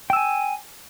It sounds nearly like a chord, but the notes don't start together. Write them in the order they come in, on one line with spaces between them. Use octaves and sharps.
G5 E6 G#5